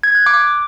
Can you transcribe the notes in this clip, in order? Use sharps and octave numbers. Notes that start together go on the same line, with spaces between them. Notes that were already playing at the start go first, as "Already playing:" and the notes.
G#6
F#6
D6